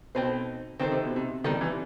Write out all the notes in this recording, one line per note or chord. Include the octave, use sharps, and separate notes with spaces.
B2 C4 D#4 A4 C5
D#3 C4 D#4 A4 C5
C3
B2
C3
B2 D#3 G3 D#4 A4
C3 E3